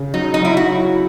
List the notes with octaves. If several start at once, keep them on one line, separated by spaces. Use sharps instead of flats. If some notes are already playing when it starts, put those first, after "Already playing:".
Already playing: C#3
F#3 D#4
D#4
F#3 E4
F#4
E4